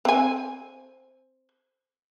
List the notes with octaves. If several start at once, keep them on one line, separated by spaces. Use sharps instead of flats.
C4 G#5